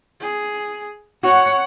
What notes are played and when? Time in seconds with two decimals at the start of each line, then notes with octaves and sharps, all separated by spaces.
0.20 G#4
1.23 F#4 C#5 F#5